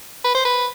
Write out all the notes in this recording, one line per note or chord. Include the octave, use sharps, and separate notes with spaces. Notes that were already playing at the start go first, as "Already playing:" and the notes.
B4
C5
B4